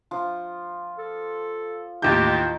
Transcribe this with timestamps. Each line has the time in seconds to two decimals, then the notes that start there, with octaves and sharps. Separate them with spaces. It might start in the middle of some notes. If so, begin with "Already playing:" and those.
0.11 F3
0.98 A4
2.02 A1 D#2 D#3 F4 G4 G6